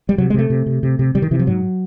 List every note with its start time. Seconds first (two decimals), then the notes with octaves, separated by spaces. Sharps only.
0.09 G3
0.18 C3 F#3
0.30 G#3
0.34 C3 A3
0.50 C3
0.66 C3
0.83 C3
0.99 C3
1.15 C3 G3
1.22 D#3
1.31 C3 E3
1.39 F3
1.47 G#2 F#3